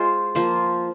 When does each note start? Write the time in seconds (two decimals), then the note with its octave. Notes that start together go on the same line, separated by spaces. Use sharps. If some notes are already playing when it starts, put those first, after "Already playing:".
Already playing: G#3 F4 C5
0.35 F3 A#3 F4 C5